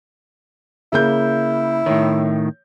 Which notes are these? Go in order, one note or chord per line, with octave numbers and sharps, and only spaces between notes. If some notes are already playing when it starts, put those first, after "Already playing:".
C#3 A#3 E4 G6
A2 D#3 C#5